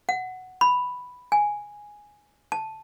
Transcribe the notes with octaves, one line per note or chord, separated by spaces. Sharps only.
F#5
B5
G#5
A5